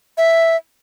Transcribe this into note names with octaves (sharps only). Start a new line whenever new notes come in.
E5